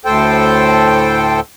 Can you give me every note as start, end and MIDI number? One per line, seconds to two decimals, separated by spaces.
0.05 1.40 38
0.05 1.40 45
0.05 1.40 69
0.05 1.40 72
0.05 1.40 79